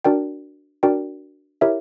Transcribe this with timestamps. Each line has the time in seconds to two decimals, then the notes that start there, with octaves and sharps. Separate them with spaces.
0.05 D4 F#4 A#4 D5 G5
0.83 D4 F#4 A#4 D5 G5
1.61 E4 G4 A#4 C#5 E5